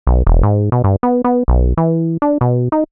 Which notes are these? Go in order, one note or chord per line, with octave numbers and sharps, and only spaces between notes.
B1
E1
G#2
B2
G2
B3
B3
B1
E3
D4
B2
D#4